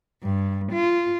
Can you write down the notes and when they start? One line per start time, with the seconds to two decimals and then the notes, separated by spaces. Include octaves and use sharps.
0.23 G2
0.72 F4